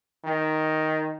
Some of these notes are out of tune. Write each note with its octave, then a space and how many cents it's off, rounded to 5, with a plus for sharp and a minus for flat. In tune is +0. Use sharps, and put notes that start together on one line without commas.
D#3 +5